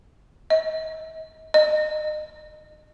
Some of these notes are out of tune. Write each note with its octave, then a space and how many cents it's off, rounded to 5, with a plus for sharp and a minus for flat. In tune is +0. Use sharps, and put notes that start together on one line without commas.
D#5 +40
D#5 -30